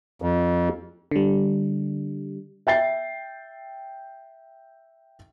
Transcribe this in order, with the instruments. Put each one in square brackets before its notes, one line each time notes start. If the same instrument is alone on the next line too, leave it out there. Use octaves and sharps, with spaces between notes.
[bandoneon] F2
[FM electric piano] D3 G3
[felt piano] E5 G5 A6 C7